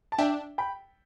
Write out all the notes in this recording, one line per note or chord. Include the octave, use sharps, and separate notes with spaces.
A5
D4 E5 G5
G5 B5